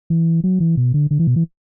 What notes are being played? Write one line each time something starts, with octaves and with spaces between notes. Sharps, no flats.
E3
F#3
E3
B2
D3
D3
E3
B2
E3